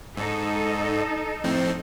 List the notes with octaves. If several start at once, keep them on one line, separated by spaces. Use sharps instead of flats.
G#2 D#4 A4
F2 A2 C4